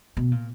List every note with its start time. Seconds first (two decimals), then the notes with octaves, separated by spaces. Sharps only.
0.17 B2
0.32 A#2